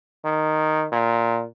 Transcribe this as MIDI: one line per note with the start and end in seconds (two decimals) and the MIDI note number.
0.25 0.86 51
0.92 1.45 46